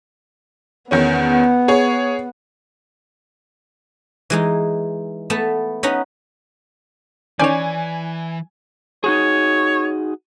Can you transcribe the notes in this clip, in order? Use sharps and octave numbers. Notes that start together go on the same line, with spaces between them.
E2 D#3 B3 C#4
G#4 C#5
E3 G#3 D#4
A3 B3 A5
B3 C#4 D#4 F#5 A#5
D#3 E3 C#4 C#5 D5 G#5 G6
D#4 F#4 G#4 C#5